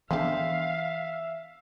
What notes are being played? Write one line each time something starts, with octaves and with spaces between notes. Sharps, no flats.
C#3 E3 B3 C4 D4 G4 E5 F5